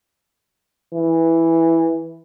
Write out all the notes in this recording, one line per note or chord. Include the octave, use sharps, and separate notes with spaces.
E3